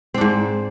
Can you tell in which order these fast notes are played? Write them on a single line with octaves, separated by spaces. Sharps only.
C4 D4 G#2